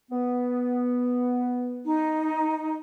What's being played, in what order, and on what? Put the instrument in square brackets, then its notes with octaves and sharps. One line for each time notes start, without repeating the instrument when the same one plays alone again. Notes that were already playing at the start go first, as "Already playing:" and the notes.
[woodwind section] B3
[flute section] D#4